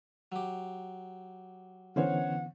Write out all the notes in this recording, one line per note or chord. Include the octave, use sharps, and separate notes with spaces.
F#3 G4
D3 E3 B3 C#4 C5 C#5 F#5